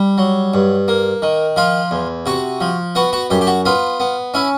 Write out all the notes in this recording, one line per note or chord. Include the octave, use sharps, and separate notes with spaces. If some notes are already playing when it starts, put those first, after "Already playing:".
Already playing: G3
F#3
G2
A#3
D#3
F3 F4
E2
C3 F#4
F3
B3 F#4
F#4
F#2 G4
G4
F#4
B3 F4
B3
C#4 E4